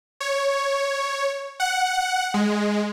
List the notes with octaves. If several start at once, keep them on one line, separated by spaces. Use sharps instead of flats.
C#5
F#5
G#3